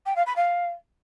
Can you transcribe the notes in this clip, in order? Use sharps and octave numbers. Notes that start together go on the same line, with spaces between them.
G5
F5
B5
F5